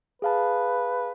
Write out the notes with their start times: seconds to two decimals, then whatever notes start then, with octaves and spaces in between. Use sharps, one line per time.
0.22 G#4 B4 F5 A5